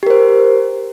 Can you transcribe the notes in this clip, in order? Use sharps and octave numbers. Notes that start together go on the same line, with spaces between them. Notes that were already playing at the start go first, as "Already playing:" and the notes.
G4 A#4 C5